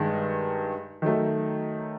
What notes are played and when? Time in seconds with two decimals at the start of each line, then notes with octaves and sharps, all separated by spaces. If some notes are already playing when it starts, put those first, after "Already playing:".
Already playing: G2 D#3 G#3
1.02 D#3 F#3 A3